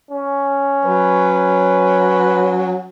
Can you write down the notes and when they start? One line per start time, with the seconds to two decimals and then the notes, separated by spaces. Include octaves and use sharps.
0.11 C#4
0.86 F#3 B4